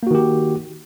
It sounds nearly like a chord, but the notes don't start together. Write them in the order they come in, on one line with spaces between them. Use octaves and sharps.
A#3 F#4 D#3 G4